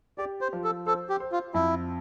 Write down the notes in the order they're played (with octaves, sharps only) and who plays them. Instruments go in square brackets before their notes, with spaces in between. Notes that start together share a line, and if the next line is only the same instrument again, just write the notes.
[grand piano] G4 [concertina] D5
[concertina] C5
[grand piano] F3
[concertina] A4
[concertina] A4 [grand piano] C5
[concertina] G4
[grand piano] C5
[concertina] F4
[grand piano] F2 [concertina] E4